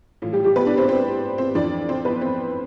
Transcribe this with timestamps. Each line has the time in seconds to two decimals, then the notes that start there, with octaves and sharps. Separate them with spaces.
0.22 A2 E3 F4
0.33 G3 G4
0.44 G3 G4
0.56 B3 B4
0.66 D4 D5
0.77 C4 C5
0.88 C4 C5
1.38 C4 C5
1.55 F2 E3 D4 D5
1.89 C4 C5
2.05 B3 B4
2.21 C4 C5